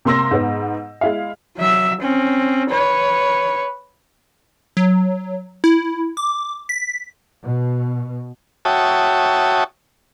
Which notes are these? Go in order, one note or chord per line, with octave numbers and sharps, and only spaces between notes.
C3 A#3 C6 E6 A#6
G#2 B3
G#3 E4 F5
F#3 E5
C4 C#4
B4 C#5
F#3
E4
D6
B6
B2
F#4 C#5 E5 G5 A5 D#6